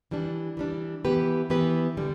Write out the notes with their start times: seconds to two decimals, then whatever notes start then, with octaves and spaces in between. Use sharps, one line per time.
0.11 E3 G3 D4
0.57 E3 G3 D4
1.05 E3 B3 G4 B4
1.50 E3 B3 G4 B4
1.97 D3 G3